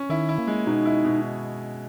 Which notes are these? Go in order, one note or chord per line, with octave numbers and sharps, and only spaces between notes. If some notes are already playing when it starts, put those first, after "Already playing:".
Already playing: C#4
D#3 E4
E4
A#3
G#3
B2 D#4
E4
B2